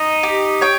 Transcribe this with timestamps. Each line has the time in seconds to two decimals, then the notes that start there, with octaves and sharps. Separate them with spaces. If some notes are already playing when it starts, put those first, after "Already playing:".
Already playing: D#4 D#5
0.23 G4
0.61 C#5 G5